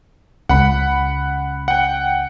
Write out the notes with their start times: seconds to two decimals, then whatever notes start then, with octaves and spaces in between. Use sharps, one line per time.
0.49 C#2 F#5 B5
1.68 F#5 G5